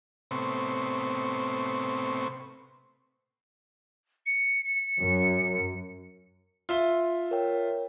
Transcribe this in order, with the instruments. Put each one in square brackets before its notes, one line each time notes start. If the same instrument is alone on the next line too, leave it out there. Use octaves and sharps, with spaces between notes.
[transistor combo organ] A2 C3 B3 C4 C#6
[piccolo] C#7
C#7
[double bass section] F#2
[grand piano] F4 E5 G7
[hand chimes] A#4 C#5 G5